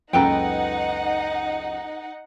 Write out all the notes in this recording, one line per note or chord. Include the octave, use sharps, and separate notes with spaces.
F#1 C#2 D#4 A4 B4 F#5 G5 A#5